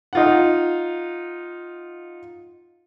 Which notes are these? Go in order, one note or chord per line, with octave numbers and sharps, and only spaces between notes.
D#4 F4 F#5